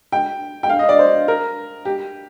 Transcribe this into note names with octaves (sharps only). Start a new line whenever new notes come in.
G5
G5
F5
D#5
D5
C5
A#4
G4